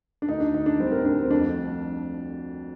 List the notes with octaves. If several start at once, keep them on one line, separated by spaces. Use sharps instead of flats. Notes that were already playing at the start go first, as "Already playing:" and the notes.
D4
D2 D#4
D4
D3 D#4
D4
G3 C4
A#4
D2 D4
C4
F2 D4